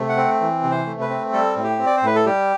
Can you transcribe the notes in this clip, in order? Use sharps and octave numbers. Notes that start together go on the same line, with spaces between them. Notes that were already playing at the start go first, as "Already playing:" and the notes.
Already playing: C3 A3
F#5
C4
E3
C3
C5
A3
B4
C4
G3 A4
A2
G4
C4
D5
C5
A2 B4
A4
G3 G4